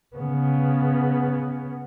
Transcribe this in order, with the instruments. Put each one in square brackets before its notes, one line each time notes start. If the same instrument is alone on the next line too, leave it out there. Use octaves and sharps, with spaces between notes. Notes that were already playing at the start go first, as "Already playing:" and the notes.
[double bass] C#3 B3